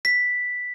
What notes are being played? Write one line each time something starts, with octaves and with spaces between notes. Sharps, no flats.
B6